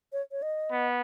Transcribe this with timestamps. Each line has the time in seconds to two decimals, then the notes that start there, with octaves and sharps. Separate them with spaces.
0.13 C#5
0.31 C#5
0.42 D#5
0.72 B3